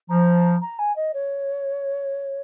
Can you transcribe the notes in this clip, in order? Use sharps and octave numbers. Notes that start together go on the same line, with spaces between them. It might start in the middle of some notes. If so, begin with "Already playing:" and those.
F3 A#5
A#5
G#5
D#5
C#5